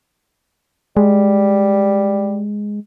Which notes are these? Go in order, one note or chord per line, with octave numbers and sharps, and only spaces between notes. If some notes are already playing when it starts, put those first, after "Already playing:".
G3 G#3